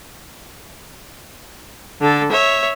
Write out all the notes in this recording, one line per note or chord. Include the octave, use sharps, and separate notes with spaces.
D3 A4
C#5 E5